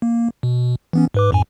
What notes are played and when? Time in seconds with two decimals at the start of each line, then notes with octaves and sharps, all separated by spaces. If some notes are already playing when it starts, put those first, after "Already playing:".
0.02 A#3
0.43 B2
0.93 E3 B3 C#4
1.14 G#2 B4 D6
1.32 F2 G#2 G#5